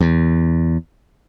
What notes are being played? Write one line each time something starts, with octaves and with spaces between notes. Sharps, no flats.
E2